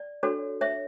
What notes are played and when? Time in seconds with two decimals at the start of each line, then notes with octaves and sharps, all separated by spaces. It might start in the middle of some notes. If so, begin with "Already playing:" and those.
Already playing: D5
0.23 D4 F#4 A4 C#5
0.61 C#5 E5